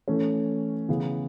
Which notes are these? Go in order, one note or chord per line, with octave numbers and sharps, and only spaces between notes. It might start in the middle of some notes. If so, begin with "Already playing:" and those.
E3 A3 C#4
C#3 E3 B3